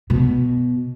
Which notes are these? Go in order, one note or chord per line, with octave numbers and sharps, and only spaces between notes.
B2